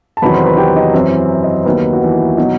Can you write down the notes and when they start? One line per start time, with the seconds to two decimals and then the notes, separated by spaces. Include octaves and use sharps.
0.17 A5
0.22 E2 C3 D#3 F#3 B4 B5
0.33 C5 C6
0.45 B4 B5
0.57 G4 G5
0.76 D#4 D#5
0.94 F#2 E3 C4 C5
1.32 E5
1.43 D#5
1.55 C5
1.65 D#2 D#3 F#3 B3 B4
1.93 F#4
2.02 E3 E4
2.37 B2 F#3 D#4